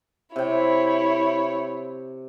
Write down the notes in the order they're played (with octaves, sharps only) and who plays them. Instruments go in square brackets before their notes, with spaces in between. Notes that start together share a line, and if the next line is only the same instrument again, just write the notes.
[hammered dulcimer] C3 G5 [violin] E4 C#5